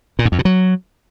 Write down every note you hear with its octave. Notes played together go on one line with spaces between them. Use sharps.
A#2
G#2
F2
B2
F#3